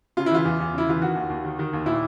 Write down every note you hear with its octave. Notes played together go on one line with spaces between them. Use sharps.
C#3 F4
E4
E3 F4
E2
E2
C#3 E4
E3 F4
D#3 F#4
D#2
D#2
D#3
D#3
D#2
A#2 E4